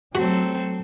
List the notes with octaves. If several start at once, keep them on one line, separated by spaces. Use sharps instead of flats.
F#3 A3 C4 F#4 A4